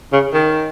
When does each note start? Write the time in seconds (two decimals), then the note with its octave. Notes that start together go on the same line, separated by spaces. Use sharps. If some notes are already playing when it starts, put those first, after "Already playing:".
0.13 C#3
0.34 D#3